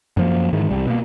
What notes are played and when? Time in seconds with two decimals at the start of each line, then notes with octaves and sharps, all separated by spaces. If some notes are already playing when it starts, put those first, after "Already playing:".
0.17 F#2 F3 A#3
0.53 G#2 D#3 E3
0.71 C2 G3
0.87 B2 A#3